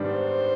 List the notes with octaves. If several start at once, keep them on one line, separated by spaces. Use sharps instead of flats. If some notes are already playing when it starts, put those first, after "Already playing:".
Already playing: G#2 D#3 G3 B3 D4
C5